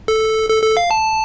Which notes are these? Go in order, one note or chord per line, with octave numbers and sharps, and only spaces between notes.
A4
A4
A4
F5
A5